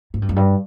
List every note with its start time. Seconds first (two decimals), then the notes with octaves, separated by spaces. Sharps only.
0.14 G#2
0.22 G2
0.29 F#2
0.36 G2